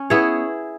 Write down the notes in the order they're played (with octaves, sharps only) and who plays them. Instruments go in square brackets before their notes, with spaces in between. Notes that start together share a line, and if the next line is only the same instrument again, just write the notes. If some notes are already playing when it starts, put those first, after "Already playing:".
Already playing: [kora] C#4
B3 E4 G#4 C#5